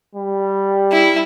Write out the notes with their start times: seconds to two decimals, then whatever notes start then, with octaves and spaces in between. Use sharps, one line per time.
0.15 G3
0.92 E4